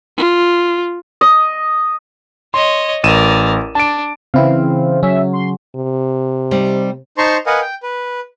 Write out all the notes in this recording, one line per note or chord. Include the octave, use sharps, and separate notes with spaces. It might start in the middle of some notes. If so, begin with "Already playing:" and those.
F4
D#5
C#5 D#5 C6
A1 A#4 D5 D#7 E7
D4 A5 D7
C#3 E3 C4 E4 F5
F#3 C#4 E5
C6
C3
G3 C4 D#4
D#4 C5 A5 A#5 C6 C#6
A#4 B4 D#5 F5 F#5 G#5
G5
B4